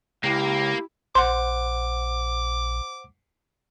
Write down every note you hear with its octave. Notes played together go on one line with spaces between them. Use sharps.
C#2 A#3 E4 G4
A#1 C5 F#5 C6 D6